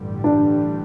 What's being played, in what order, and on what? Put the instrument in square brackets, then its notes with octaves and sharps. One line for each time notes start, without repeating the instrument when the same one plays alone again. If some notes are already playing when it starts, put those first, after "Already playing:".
Already playing: [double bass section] A1 G2 D3 G3
[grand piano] D4